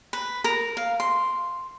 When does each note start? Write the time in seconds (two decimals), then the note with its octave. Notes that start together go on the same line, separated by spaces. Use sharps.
0.13 B4
0.44 A#4
0.77 F5
1.00 C6